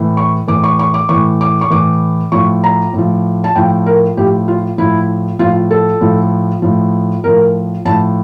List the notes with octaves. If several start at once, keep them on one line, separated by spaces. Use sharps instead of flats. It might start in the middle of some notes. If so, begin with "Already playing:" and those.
Already playing: A2 E3
C#6
A2 E3 D6
C#6
C#6
D6
A2 E3 C#6
D6
C#6
A2 E3 D6
A2 F3 C#6
A#5
A2 F3
A5
A2 F3 G5
A#4
A2 F3 G4
F4
A2 F3 E4
A2 F3 F4
A4
A2 F3
A2 F3
A2 F3 A#4
A2 F3 A5